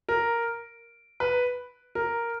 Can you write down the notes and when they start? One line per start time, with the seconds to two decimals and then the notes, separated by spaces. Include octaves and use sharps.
0.09 A#4
1.20 B4
1.95 A#4